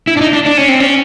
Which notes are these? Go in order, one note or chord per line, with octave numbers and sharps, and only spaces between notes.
E4
D4
D#4
D4
D4
C#4
C4
C#4